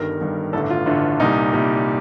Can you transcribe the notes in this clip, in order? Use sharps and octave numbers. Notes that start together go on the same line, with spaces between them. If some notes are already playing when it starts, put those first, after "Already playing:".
Already playing: G1 G2 D#3 G3 A#4
G1 G2 D#3 G3
A1 G2 D3 A3 A4
F4
A1 G2 D3 A3
C2 A#2 G3 D#4
C2 A#2 G3